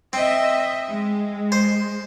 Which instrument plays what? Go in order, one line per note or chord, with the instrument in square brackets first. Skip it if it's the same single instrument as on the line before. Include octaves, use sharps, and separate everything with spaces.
[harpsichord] C4 [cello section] D#5 E5
[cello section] G#3
[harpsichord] C5